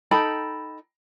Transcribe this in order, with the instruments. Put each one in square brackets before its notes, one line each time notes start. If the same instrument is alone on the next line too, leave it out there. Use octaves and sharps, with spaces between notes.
[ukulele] D#4 A4 G5 B5